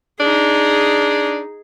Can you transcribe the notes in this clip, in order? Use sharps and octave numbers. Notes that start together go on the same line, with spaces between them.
D4 D#4 G#4